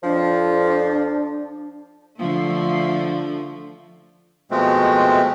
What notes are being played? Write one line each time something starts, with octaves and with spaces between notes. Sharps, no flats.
F2 F3 D4
D3 F3 A3
B2 F3 G#3 A3 C4